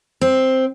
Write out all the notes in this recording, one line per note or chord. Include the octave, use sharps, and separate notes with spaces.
C4